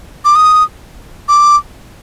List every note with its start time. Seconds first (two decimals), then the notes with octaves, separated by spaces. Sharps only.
0.25 D6
0.35 D#6
1.28 D6